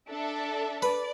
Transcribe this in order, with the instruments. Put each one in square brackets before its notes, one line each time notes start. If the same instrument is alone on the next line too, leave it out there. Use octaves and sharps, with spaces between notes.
[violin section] D4 A4 E5 A5
[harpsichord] B4 [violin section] D5